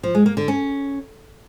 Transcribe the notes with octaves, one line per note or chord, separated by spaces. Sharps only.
F3
G#3
A#3
D3
C#4